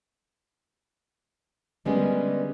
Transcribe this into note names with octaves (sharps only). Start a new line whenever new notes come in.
D3 G3 G#3 A#3 B3 C#4